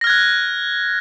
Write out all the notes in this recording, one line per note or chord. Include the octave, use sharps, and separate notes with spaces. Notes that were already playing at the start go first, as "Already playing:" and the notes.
F6 F#6 G#6 A#6